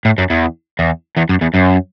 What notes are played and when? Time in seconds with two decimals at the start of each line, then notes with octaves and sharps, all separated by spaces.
0.05 A2
0.18 F#2
0.30 E2
0.79 E2
1.17 E2
1.29 F#2
1.41 E2
1.54 F#2